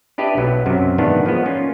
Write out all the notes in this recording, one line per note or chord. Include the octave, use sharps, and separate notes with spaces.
D4 E4 G4 B4 D5 D#5
B1 F#3 B3
F#2 C3 F#3
G#2 D#3 E3 A#3 B3 D4
F3 G#3 B3
A#3 C#4 F4